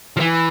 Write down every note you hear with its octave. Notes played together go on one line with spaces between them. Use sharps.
F3
E3